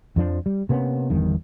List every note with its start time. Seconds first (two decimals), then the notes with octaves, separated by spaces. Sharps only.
0.16 F2 F3 D4
0.46 G3
0.69 C3 A#3 B3 C#4
1.10 G1 E2 G2 D#3